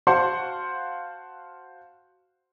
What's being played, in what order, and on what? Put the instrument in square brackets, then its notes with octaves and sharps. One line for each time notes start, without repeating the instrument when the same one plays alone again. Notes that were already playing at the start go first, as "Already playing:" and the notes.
[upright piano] F#4 C5 F5 F#5 A5 C6